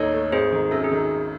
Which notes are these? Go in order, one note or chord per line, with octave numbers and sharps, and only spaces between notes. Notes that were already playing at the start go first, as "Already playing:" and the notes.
Already playing: A1 D#2 A3 D#4 A4 C#5
A3
G#1 G#4 C5
D#3
F#2 A4
G#4
D#3